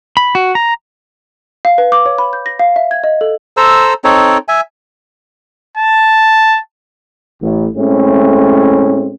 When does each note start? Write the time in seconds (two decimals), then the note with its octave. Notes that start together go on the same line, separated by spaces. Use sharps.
0.17 B5
0.35 F#4
0.55 A#5
1.65 F5
1.78 B4
1.92 D6
2.06 C#5
2.18 B5
2.33 G6
2.46 A#6
2.59 F5
2.76 E5
2.91 G#6
3.04 D#5
3.21 A4
3.57 A4 C5 A#5 E6
4.04 C4 D#4 A4 C#5
4.48 E5 G#5
5.77 A5
7.41 A1
7.76 A2 G#3 A3 C4 C#4